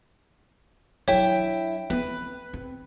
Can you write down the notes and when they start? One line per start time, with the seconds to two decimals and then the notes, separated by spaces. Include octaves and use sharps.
1.08 F#3 D4 E4 C#5 E5 G5
1.90 B3 C4 B4
2.53 C4